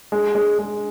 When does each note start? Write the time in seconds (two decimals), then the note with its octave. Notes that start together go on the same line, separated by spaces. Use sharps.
0.12 G#3
0.35 G#3
0.59 G#3